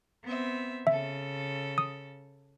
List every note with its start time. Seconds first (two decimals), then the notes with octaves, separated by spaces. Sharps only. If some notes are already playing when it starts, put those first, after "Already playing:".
0.24 B3 C4 E5
0.87 C#3 A4 E5
1.78 D#6